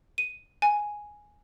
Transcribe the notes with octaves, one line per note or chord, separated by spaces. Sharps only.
D#7
G#5